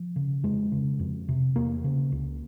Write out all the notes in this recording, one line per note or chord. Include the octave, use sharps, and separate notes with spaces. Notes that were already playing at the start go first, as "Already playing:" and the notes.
Already playing: F3
C#3
F2 G#3
C#3
F2
C3
E2 A#3
C#3
C#2